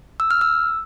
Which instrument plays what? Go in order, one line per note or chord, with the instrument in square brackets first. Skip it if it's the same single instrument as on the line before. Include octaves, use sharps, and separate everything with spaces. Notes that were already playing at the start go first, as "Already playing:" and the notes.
[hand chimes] E6
F6
E6